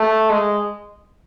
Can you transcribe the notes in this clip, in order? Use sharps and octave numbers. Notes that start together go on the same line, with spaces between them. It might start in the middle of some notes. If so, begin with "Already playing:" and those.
Already playing: A3
G#3